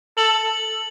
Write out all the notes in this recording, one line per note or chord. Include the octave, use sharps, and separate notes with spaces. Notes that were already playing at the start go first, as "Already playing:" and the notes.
A4 F#7